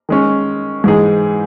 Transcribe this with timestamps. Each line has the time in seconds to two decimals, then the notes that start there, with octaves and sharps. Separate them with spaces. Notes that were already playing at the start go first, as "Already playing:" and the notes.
0.09 D#3 G#3 C#4
0.84 G#2 E3 G#3 D#4 G#4